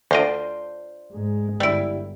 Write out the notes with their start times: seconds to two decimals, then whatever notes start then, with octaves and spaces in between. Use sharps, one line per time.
0.11 D2 D4 F4 C5 D#5
1.11 G#2 G#3
1.60 G1 G3 E4